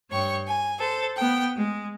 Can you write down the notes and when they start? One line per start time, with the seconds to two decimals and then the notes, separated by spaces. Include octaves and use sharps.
0.11 G2 C#5 G5 C#6
0.47 G#5
0.79 A4 C5
1.17 B3 G5
1.57 G#3